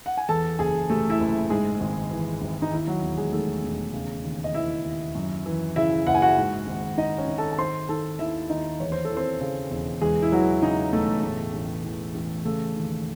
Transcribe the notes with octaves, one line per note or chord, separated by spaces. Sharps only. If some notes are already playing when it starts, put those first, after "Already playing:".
F#5
G#5
E2 A4 A5
F#1 G#4 G#5
C3 A3 A4
E4 E5
F#1
G#2 G#3 G#4
G#1
E3
G#1
D#4
D#2 E4
F#3 F#4
E1
G#3 G#4
D#3 A3 A4
E1
C#3
D#2
D#5
E3 E4 E5
D#2
F#2
E3
C#3 E4 E5
F#1 F#5
G#5
F#4 F#5
G#2
G#1
D#3 D#4 D#5
C#4 C#5
G#1
A4 A5
A5
D#3 C5 C6
D#3 A4 A5
D#2 E4 E5
D#2 D#4 D#5
E2 C#5
C5
A4
E3
C4 C5
C#3
E1
E2 G#3 G#4
E4
E3 F#3 F#4
C#3 D#4
E1 A3 A4
A2
A1
E3
A1
C#3 A3 A4
D#2